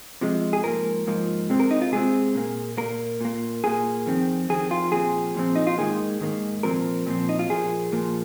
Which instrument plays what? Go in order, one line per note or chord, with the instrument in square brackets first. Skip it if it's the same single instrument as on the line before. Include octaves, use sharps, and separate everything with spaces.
[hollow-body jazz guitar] C3 F3 G#3
G#4
G#2 F3 A#3 A#4
G#2 F3 A#3
C3 G#3 C4
A#4
D#4
F4
C3 G#3 C4 G#4
A#2 A#3
A#2 A#3 A#4
A#2 A#3
A#2 A#3 G#4
F2 D#3 C4
F2 D#3 C4 G#4
F4
A#2 F3 C4 G#4
A#2 F3 C4
D#4
F4
G#2 D#3 A#3 G#4
G#2 D#3 A#3
A#2 F3 C4 A#4
A#2 F3 C4
D#4
F4
A#2 F3 A#3 G#4
A#2 F3 A#3